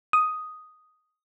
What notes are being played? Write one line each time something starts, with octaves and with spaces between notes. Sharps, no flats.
D#6